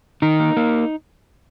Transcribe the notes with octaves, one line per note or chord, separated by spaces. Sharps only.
D#3 D#4
A#3
A#3